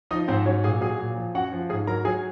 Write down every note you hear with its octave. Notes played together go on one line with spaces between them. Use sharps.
F3 D#4 D#5
G#2 C4 C5
F#3 C#4 C#5
A#2 G#4 G#5
F#3 G#4 G#5
A#2
F3
F#2 F#4 F#5
F3
G#2 G#4 G#5
F#3 A#4 A#5
F#3 G#4 G#5